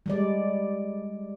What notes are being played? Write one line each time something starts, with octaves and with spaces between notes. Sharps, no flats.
G3 G#3 D5